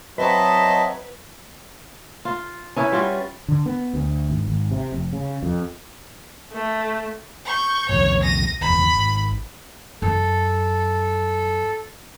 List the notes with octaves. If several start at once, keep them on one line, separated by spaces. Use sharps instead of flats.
F#3 C4 B4 D#5 E5 A5
F4
C#4 E4 B4
G3 F4 F#4
D3
B3
D2
G#1
G#1
C3
F1
C#3
F2
A3
C#6 G6
C2 F2 A#2 C#5
A#6 D#7
F#1 E2 B5
G#1
F#2 A4